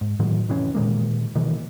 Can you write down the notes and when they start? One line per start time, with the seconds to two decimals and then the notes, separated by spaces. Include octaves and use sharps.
0.01 G#2
0.19 A2 D#3 E3 F#3
0.49 F1 E3 C#4
0.75 A#2 D#3 G#3 A#3
1.35 B2 D#3 E3 A#3